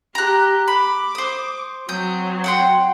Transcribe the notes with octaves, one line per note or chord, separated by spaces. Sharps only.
G4 A#5 F#6
B5 D6
C5 D#6
F#3 C4 D#6 G6
F#5 G5 C6